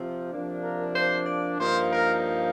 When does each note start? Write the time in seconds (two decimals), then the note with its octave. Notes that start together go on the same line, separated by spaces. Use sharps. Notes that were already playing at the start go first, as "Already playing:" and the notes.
Already playing: C3 F3 C4
0.31 C3 F3 A#3 D4
0.63 A#4
0.95 C5
1.26 D5
1.59 G2 F3 A#3 D#4 C5
1.91 A#4